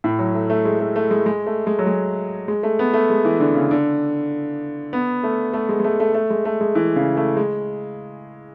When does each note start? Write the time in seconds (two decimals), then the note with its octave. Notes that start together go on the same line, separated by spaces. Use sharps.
0.04 A2
0.19 F#3
0.35 A3
0.50 A3
0.65 G#3
0.80 A3
0.96 A3
1.11 G#3
1.26 G#3
1.47 A3
1.67 G#3
1.79 F#3
1.87 G#3
2.48 G#3
2.63 A3
2.79 B3
2.93 A3
3.10 G#3
3.25 E3
3.40 D3
3.55 C#3
3.71 D3
4.93 B3
5.23 A3
5.54 A3
5.69 G#3
5.80 G#3
5.84 A3
6.00 A3
6.14 A3
6.30 G#3
6.45 A3
6.61 G#3
6.75 E3
6.96 C#3
7.17 A3
7.37 G#3